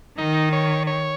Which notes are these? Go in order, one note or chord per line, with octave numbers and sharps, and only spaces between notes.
D#3 D#4
C#5
C#5